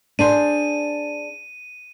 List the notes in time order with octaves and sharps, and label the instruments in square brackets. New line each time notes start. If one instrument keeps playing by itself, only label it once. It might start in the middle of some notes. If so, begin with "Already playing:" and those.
[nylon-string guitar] D4 G#4 C5 [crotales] D#7